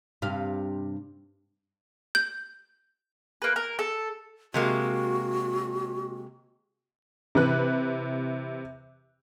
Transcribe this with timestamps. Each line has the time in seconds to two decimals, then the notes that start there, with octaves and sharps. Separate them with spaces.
0.22 G2 C3 F5
2.15 G6
3.42 A#3 B4
3.56 A#4
3.79 A4
4.54 C3 G#3 A#3 F#4
7.35 C3 E3 B4 F#6